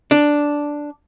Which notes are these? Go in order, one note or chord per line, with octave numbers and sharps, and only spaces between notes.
D4